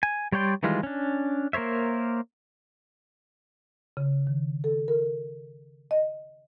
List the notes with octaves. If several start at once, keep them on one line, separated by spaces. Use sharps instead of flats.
G#5
G3 C#5 D5 G5 C6
D#3 E3 G3 G#3 F4
C#4 D4
A#3 A#4 C5 C#5 E5
C#3
D#3
A4
A#4
D#5